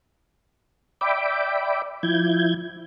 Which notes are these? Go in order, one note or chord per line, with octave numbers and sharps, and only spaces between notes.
D5 E5 G5 B5 D6
F3 E4 G6 G#6